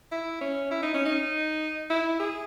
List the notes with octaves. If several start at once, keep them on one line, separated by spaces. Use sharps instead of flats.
E4
C#4
E4
D#4
C#4
D#4
E4
G#4